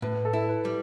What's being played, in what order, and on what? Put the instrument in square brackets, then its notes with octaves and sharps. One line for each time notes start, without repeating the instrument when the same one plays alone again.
[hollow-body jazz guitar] A2 [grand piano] B4
[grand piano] A4
[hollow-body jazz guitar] E4
[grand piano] B4
[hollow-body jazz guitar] G3